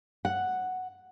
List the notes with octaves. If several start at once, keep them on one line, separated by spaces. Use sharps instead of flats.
F#5